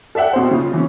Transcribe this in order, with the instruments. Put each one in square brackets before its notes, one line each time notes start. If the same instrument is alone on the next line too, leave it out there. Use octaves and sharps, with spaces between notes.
[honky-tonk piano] A4 D5 E5 F#5 G5
B2 C5
C#3 F4
E3 C#4